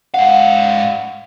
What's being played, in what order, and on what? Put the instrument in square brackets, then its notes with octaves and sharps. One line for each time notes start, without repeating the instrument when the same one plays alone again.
[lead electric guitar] G#2 F5 [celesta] F#5